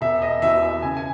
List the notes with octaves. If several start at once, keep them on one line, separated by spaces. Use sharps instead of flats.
E1 E5
D#5
E2 B2 E5
E5
C#2 G#5
G#5